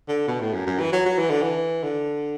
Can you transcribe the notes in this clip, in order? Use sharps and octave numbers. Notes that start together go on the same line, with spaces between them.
D3
B2
A2
F#2
F#2
E3
F#3
F#3
E3
D3
E3
D3